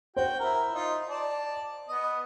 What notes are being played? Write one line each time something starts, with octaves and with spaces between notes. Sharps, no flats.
F#4 C5 G5
E4 A#4
D#4 F4
D5 A5
B3 D#5